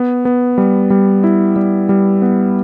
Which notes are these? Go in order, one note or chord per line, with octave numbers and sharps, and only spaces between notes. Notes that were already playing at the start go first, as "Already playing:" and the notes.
Already playing: B3
B3
G3
G3
E4
G3
G3
B3